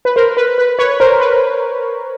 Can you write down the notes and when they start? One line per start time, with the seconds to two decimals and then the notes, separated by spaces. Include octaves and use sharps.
0.05 B4
0.16 A#4 C5
0.37 B4
0.58 B4
0.79 B4 C#5
1.00 A#4 C5
1.20 B4